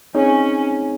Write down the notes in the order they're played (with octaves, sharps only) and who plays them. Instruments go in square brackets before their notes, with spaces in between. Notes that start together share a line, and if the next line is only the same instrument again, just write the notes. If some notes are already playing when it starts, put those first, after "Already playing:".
[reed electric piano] C4 D#4 G#4 C#5 [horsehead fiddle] C#4